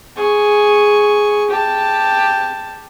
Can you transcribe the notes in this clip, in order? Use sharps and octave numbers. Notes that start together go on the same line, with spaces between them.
G#4 C#6
G4 A5